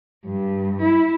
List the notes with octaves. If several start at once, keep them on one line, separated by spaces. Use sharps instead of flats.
G2
E4